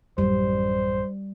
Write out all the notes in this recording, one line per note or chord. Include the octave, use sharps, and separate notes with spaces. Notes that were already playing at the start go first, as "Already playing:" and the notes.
A1 F#2 G3 C5